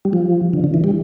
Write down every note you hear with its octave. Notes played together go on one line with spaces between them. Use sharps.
G3
F3
D3
D3
E3
G3